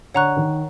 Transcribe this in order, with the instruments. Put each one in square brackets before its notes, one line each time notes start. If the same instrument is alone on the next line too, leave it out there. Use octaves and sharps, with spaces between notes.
[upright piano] D3 [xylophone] C#5 F#5 A#5 C#6 F#6
[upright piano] D#3